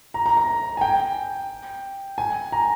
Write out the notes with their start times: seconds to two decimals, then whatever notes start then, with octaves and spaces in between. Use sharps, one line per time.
0.14 A#5
0.26 A#5
0.37 A#5
0.77 G#5
0.81 G5
2.18 G#5
2.52 A#5